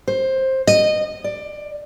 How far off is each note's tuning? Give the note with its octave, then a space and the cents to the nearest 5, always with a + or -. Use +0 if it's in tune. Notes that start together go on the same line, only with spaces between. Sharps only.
C5 +15
D#5 -15
D5 +15